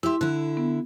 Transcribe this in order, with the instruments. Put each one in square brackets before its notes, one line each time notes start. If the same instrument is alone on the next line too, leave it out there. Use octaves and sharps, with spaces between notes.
[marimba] E4 C6 [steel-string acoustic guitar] G4 E5
[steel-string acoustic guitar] D3 E4 [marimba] F#6
[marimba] B3